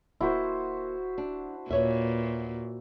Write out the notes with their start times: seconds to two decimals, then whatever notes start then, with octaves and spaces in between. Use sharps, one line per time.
0.21 D1 A#3 E4 F#4 C5
1.18 D4
1.70 D#2 A#2 B4 C#5 E5